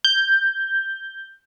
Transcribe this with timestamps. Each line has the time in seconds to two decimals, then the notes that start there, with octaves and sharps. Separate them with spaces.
0.05 G6